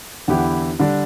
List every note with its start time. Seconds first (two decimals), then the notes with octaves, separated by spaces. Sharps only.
0.28 E2 D3 B3 E4 G4
0.80 D3 G3 D4